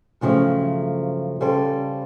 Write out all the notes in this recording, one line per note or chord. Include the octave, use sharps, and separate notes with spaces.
G2 C#3 F3 F#3 A3
C#3 G3 A4 C5